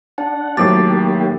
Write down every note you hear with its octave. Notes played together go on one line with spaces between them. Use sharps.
D4 F#5 A5
A2 D#3 F#3 A#3 G4 D6 A6